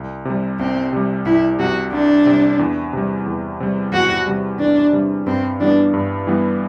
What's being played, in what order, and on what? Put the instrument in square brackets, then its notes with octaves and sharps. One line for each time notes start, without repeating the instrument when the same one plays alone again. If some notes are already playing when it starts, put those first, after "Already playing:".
Already playing: [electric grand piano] C2
C3 G3
[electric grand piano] C2 [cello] C4
[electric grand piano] C3 G3
[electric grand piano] C2 [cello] E4
[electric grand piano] C3 G3 [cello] F#4
[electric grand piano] C2 [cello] D4
[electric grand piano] C3 G3
E2
C3 G3
E2
C3 G3
[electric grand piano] E2 [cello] F#4
[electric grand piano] C3 G3
[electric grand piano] E2 [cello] D4
[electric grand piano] C3 G3
[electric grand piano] G2 [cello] C4
[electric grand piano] E3 G3 B3 [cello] D4
[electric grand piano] G2
E3 G3 B3